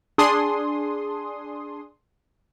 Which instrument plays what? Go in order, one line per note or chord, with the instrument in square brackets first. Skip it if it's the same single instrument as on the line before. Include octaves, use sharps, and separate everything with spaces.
[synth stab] D4 G#4 C6 D#6